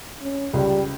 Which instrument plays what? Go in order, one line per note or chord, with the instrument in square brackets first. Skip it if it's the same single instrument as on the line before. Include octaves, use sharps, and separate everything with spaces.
[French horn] C#4
[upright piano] C#2 [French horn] G3